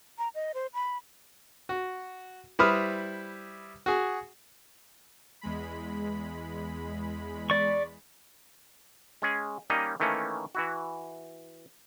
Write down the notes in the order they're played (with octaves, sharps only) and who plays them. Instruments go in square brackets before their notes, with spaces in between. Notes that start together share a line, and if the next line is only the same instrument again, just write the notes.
[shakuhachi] A#5
D#5
C5
B5
[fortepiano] F#4
G3 E4 B4 C5 D#6 F6
F#4 G#4
[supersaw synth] E2 G#3 B5
[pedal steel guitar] D5 C#6
[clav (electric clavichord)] G#3 C#4 G#4
G3 A#3 C#4 D#4 D#5
D#3 E3 A3 A#3 C#4
E3 E4 F#4